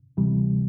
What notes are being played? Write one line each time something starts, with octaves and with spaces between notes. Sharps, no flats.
D2 C3 E3 G3